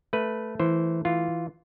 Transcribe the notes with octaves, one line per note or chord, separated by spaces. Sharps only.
A3 B4
E3 C5
E3 F4